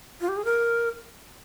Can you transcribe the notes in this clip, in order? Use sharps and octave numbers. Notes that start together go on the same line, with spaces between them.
F4
G4
G#4
A#4